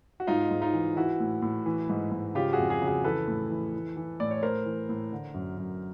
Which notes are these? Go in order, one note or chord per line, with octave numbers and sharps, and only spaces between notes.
F#4
G#2 D#4 F4
G#2
D#4 F4
E3
E3 E4 F#4
A2
A2
E3
G#2
G#2
C#3 F4 G4
F#4 G#4
F2
F#4 G#4
C#3
F#4 G#4
E3 A4 B4
A2
E3
E3
E3
A2 D5
C#5
A2 A#4 C5
E3
A2
D3
F#2
F#2